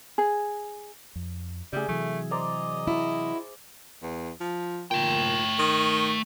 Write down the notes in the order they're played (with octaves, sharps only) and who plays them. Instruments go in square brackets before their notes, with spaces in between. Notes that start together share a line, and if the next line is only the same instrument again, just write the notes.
[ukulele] G#4
[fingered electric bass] F2
[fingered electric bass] C#3 A3 [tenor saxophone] G3 [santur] G#4 E5
[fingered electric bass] C3 E3 F#3 [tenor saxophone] A3
[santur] C5 D5 A#5 [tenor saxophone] D#5
[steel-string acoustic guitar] E4 F#4
[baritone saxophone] E2
F3
[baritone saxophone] A#2 [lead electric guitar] A3 G5
[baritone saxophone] D#3